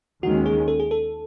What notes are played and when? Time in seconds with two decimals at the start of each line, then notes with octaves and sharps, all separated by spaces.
0.23 D#2 D#3 G#3 C#4 F#4
0.46 G#4
0.68 A4
0.80 G#4
0.91 A4